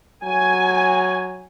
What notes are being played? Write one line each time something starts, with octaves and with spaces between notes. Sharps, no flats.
F#3 G#5